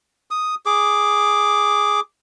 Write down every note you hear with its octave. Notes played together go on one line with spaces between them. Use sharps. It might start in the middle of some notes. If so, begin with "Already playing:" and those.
D#6
G#4 D6